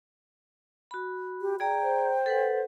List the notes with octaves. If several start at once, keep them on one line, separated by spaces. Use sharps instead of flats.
F#4 B5
G4
G#4 D5 G5 A#5
C5
A4 B4 F#5